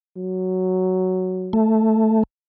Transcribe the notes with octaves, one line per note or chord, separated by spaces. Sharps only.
F#3
A3